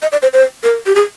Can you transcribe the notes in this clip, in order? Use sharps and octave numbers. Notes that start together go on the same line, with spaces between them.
D#5
D5
C5
C5
A#4
G4
G#4